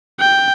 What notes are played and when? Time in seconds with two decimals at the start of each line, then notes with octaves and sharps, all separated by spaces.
0.20 G5